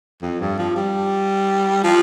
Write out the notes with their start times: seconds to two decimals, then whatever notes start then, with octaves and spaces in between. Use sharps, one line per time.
0.22 F2
0.41 G2
0.58 F3
0.76 G3
1.84 F3